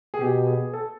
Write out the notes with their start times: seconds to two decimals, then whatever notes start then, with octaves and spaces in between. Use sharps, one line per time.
0.14 G#4
0.21 B2 G4
0.47 G#4
0.73 A4